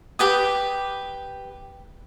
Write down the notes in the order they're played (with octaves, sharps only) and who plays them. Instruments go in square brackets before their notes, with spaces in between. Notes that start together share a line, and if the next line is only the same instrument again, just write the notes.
[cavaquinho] G4 B4 D#6